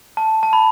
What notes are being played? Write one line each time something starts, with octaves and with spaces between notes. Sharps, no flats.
A5
A5
B5